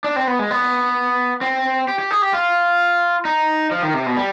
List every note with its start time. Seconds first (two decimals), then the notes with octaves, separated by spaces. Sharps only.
0.04 D4
0.16 C4
0.27 B3
0.39 G#3
0.51 B3
1.41 C4
1.88 G4
1.99 G4
2.11 G#4
2.22 G4
2.33 F4
3.25 D#4
3.71 F3
3.82 D#3
3.94 C3
4.06 B2
4.16 G3